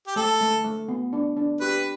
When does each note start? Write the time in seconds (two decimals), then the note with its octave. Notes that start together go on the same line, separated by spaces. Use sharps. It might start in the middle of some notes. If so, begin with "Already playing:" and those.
0.07 G4
0.16 A3 A4
0.41 A3
0.64 A3
0.89 B3
1.13 D4
1.37 D4
1.61 G4 B4